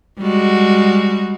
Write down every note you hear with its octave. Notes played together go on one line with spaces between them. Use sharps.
G3 G#3 F#4